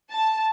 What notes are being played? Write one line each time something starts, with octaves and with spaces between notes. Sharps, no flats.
A5